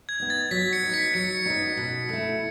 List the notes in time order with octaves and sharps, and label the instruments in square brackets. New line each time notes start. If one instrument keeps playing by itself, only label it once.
[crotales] G#6
[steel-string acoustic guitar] B3 D#4
[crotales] A6
[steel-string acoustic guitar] F#3 [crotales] B6
[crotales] C#7
[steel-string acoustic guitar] B3 D#4
[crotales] B6
[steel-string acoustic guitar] F#3 [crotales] C#7
[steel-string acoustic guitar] B3 D#4
B2
A3 E4